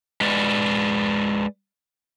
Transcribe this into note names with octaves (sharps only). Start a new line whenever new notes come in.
G#3 B4 D5